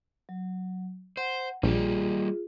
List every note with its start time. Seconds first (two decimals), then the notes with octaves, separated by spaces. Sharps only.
0.29 F#3
1.17 C5 F#5
1.63 A#1 G3 A#3 F4 G4 G#4